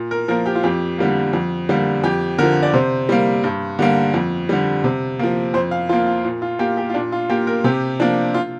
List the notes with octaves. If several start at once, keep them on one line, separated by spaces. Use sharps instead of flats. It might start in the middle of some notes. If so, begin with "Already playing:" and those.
Already playing: A#2
A#4
F3 A#3 A#4
G4
F4
F2 G4
D3 G3 A#3
F2
D3 G3 A#3
F2 G4
D3 F3 A#4
D5
C3 C5
G3 A#3
G2
D3 G3 A#3
F2
D3 G3
C3
F3 A#3
F2 C5
F5
F3 A#3 F4
F4
A#2
F4
A#3 G4
G4
F4
A#2 D4
F4
A#3 G4
A#4
C3 G4
F3 A#3 D4
F4